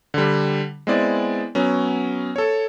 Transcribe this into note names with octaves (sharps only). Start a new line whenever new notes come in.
D3 G3
G#3 B3 C4 E4 D5
F#3 B3 C#4
A4 C#5